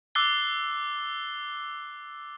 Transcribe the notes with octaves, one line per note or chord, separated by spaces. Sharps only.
D6 E6 F#6 A6 C7 G7